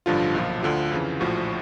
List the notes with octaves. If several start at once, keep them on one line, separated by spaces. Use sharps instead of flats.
A1 G2 D3 F3 F4
B1 A#2 F3
D2 D3 F3 F4
F2 C#3 E3
A#1 A2 F3 F#4